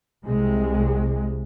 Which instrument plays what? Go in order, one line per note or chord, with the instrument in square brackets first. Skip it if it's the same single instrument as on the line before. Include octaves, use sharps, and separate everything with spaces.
[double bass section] C2 C3 G#3